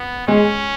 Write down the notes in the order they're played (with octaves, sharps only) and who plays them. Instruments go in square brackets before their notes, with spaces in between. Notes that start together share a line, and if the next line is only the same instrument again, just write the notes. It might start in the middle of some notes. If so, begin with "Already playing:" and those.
Already playing: [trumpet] B3
[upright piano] G#3 [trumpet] C#4